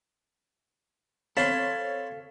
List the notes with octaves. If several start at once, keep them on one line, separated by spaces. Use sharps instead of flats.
C4 A4 C#5 F5 A5 B5 C6 B6